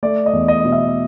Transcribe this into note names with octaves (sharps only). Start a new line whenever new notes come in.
A3 D5
D#5
E2
D#5
B2
E5